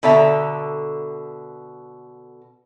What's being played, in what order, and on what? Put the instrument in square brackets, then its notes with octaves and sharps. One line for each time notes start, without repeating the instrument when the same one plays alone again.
[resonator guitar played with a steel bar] B2 D3 A4 E5 A#5